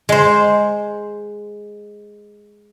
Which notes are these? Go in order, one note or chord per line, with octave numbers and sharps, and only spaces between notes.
G#3 C5